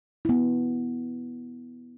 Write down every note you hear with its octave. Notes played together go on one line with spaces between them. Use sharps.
B3 E4